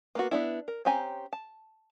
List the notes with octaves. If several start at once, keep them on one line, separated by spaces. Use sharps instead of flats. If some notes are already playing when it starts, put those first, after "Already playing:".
A#3 B3 F#4
B3 D4 E4
A#4
C4 C#4 G4 G#5 A#5
A5